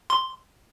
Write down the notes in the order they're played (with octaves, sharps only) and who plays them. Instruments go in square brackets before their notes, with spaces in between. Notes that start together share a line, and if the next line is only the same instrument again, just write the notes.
[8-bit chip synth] C6